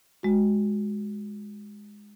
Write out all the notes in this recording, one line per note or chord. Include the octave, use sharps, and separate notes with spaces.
G#3 F#4